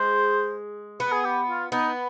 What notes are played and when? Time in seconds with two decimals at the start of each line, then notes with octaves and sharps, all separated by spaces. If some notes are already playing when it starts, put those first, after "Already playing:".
Already playing: G#3 C5
1.00 B3 B4
1.12 G#4
1.24 G4
1.48 F4
1.72 B3 D#4